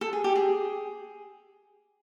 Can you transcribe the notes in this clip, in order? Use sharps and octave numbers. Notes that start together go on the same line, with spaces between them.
A4
G#4
G4
G#4